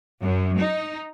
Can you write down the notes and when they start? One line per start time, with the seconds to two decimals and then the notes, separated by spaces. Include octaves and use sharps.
0.22 F#2
0.59 D#4